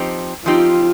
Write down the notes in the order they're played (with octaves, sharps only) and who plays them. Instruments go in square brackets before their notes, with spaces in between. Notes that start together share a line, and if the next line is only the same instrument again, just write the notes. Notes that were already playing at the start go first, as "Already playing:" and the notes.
Already playing: [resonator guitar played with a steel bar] F3 C4 D#4 G4
[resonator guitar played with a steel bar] F3 C4 D#4 G4 [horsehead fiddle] F4